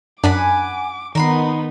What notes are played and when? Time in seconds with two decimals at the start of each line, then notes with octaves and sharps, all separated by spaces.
0.23 F#2 D4 F#5 G#5 B5 D6
1.15 D#3 B3 D#4 A#4 B5 C6